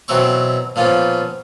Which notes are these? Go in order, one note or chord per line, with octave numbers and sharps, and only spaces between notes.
B2 E3 F#3 C4 C#6
A#2 F3 B3 C#4